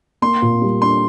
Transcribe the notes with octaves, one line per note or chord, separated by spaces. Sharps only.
A#3 C6
A#2
G3
D4 C6